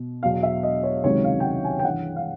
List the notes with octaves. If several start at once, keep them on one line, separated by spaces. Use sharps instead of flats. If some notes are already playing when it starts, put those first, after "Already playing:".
Already playing: B2
E2 B2 F#3 F5
E5
D#5
C#5
C#2 C3 D#3 F#3 C#5
F5
G5
F#5
G#5
G5
G2 E3 F#5
F5